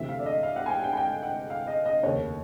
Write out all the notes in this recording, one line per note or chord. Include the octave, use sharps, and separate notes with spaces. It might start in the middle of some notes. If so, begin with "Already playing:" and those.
Already playing: D2 C3 E3 A3 E5
F5
D5
D#5
F5
F#5
G#5
G5
G5
G#5
G5
F#5
F5
D#5
D#5
F1 D#2 C#3 C#5